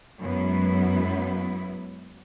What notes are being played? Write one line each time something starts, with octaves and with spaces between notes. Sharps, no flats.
F#2 G#3 B3 E4